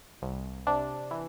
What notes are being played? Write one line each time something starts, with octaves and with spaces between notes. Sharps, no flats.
C2
C3 D4
E3